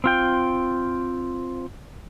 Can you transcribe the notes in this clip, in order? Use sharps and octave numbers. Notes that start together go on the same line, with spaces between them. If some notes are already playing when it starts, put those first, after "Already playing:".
C4 F4 G5